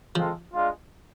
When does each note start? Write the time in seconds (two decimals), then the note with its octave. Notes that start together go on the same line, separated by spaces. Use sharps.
0.15 F3 G#3 C4 F4 A4
0.54 G#3 D4 F4